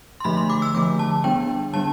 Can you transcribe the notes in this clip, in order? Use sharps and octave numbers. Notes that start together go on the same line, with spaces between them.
C6
D3 F3 A3 B5
C6
D6
E6
D3 F3 A3 D6
A5
D3 G3 B3 D4 G5
D3 G3 B3 D4 A5